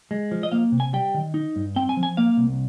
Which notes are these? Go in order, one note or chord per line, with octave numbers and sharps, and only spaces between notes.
G#3
F3
D#5
A#3 F5
C3
G#5
G3 G5
D#3
D#4
G2
C4 G5
G#5
F3
G#5
A#3 F5
C2